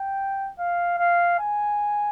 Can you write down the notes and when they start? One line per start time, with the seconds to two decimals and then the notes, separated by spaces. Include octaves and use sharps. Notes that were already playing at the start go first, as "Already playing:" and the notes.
Already playing: G5
0.59 F5
0.99 F5
1.39 G#5